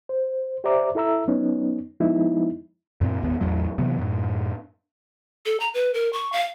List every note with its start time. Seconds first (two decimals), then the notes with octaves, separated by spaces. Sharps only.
0.09 C5
0.64 G4 C5 D5 E5 A#5 D6
0.95 E4 A4 E5 A#5 E6
1.28 F#3 B3 C#4 D#4
2.00 F3 G#3 B3 D#4 E4
3.01 F#2 A#2 C4
3.22 D#1 G#1 D#2 B3
3.41 A1 E2 A2 F#3
3.78 C3 E3 F#3 B3
3.99 F#2 A2
5.46 A4
5.60 A#5
5.74 B4
5.94 A#4
6.13 C#6
6.32 F5